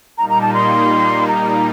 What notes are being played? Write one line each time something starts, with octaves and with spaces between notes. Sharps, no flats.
A#2 G3 A#3 D#4 A#5
A#5
A5
C6
A#5